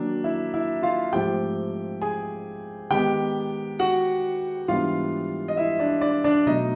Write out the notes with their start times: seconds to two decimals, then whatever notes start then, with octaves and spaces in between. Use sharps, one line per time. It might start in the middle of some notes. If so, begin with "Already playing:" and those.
Already playing: D#3 F#3 A#3 D4
0.24 E4 E5
0.54 E4 E5
0.83 F4 F5
1.13 G#2 F3 A3 C4 G4 G5
2.02 G#4 G#5
2.90 D#3 G#3 B3 G4 G5
3.79 F#4 F#5
4.68 G#2 E3 G3 B3 D4 F4 F5
5.48 D#5
5.57 E4 E5
5.79 D4 D5
6.01 D4 D5
6.24 D4 D5
6.46 B2 F#3 A3 D#4 D#5